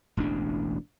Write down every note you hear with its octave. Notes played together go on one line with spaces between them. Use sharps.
E1 A1 D2 D4